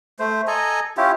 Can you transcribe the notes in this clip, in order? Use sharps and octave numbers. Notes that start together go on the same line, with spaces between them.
A3 C5
A4 D#5 G#5 A#5
C#4 E4 F4 G4